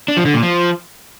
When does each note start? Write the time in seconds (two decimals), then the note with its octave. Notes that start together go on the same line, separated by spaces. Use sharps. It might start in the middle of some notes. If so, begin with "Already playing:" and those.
0.08 D4
0.17 F3
0.26 D3
0.34 A#2
0.43 F3